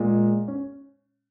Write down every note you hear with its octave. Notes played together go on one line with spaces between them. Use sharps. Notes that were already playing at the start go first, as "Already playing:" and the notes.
Already playing: A#2 G#3
C#4